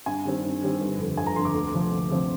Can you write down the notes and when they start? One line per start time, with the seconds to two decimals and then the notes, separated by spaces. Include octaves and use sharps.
0.06 G2 G#5
0.25 D#3 G3 C4
0.44 G2
0.62 D#3 G3 C4
0.80 G1
0.98 F2 D3
1.17 G1 G#5
1.26 A#5
1.36 F2 D3 C6
1.45 D6
1.55 D2
1.73 C3 F3 C4
1.91 D2
2.10 C3 F3 C4